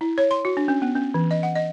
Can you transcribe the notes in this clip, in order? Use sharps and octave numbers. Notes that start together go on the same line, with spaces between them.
E4
C#5
C6
F#4
D4
C#4
B3
C#4
E3
D#5
F#5
D#5